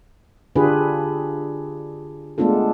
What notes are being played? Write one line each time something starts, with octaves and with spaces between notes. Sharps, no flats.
D3 D4 F4 G4 G#4 B4
G#3 A3 B3 D4 F4 A4